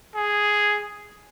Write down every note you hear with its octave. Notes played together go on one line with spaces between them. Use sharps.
G#4